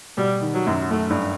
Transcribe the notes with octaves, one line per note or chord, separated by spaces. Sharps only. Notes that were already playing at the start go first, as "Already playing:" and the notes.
B2 G3
D#3
F#3
F#2
F#2 A3
G2